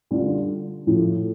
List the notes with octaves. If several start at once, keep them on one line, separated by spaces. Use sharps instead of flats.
D3 G3 D4 F4
A2 F3 A3